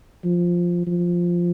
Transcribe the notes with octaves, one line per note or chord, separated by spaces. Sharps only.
F3
F3